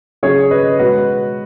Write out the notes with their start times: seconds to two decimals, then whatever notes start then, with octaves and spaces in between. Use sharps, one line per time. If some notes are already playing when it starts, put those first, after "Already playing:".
0.23 C#3 F#3 G#4 C#5
0.51 B4 D#5
0.79 B2 G#3 F#4 B4